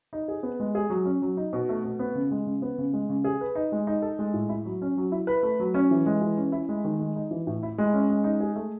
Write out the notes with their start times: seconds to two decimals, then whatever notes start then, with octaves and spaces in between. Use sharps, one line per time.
0.13 D#4
0.28 G#4
0.43 B3
0.60 G#3
0.75 G#4
0.90 F#3
1.06 C#4
1.22 F#3
1.37 D#4
1.53 B2
1.69 A3
1.84 B2
1.99 B3
2.15 C#3
2.31 G#3
2.47 C#3
2.62 B3
2.78 C#3
2.93 G#3
3.09 C#3
3.24 G#4
3.41 B4
3.55 D#4
3.72 G#3
3.87 D#4
4.02 A4
4.19 G#3
4.33 A2
4.49 E4
4.65 F#3
4.82 C#4
4.97 F#3
5.12 E4
5.27 B4
5.43 A3
5.60 F#3
5.74 C#4
5.91 E3
6.06 G#3
6.21 E3
6.37 C#4
6.52 E4
6.69 G#3
6.85 D#3
6.99 G#3
7.16 D#4
7.31 E3
7.47 A2
7.63 E4
7.78 G#3
7.94 C#4
8.10 G#3
8.24 D#4
8.40 G#4
8.55 A3